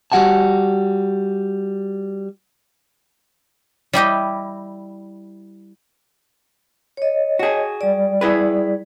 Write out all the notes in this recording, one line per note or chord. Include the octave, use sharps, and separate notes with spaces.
G3 F#4 F#5 G#5 A5
G3 E4 G4 D#5
C#5 D#5
F#4 G#4
G3 D5
E4 G#4 B4